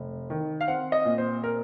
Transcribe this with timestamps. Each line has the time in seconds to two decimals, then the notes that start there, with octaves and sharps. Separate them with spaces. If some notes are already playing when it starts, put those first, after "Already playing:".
Already playing: F1
0.30 D#3
0.61 F5
0.68 C4 F#5
0.92 D#5
1.05 A#2
1.18 C5
1.44 A#4